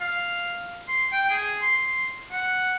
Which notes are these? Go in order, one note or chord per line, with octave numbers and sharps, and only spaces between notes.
F5
C6
G5
G#4
C6
F#5